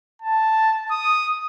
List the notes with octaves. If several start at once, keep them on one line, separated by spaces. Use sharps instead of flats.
A5
D#6